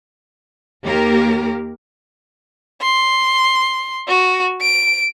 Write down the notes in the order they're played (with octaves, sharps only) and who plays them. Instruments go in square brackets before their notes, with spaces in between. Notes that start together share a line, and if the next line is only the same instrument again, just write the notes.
[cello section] D#2 A#3 G4 A#4
[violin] C6
F#4
D7